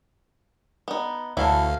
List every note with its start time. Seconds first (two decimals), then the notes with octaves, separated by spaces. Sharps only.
0.88 B3 D#4
1.37 D2 E3 F#3 D4 E4 A4 F5